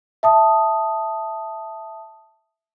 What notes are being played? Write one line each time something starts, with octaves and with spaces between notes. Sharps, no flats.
E5 A5 D#6